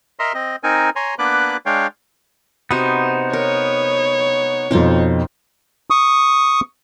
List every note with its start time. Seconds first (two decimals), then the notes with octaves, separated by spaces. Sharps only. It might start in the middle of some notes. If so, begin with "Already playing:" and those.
0.19 A#4 D#5 E5 A#5 C6
0.34 C4 D#5
0.63 C4 D#4 A#4 G#5
0.96 C#5 G#5 A#5 C6
1.19 A#3 B3 D4 B4 D6 F#6
1.66 G#3 D4 C#5 F5 G5
2.71 C3 B3 D#4 F#4 C5
3.33 A#4 C#5
4.71 F2 B2 C4 D#4 F4
5.90 C#6 D#6